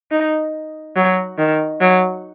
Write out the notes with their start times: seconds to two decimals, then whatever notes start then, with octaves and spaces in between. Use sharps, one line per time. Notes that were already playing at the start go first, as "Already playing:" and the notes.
0.11 D#4
0.96 F#3
1.38 D#3
1.81 F#3